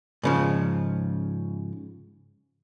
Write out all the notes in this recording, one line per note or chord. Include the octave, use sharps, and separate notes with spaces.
G#2 C#3 F3